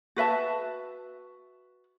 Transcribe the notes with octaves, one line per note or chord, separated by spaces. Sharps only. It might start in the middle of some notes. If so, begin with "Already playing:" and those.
F#4 B4 E5 A5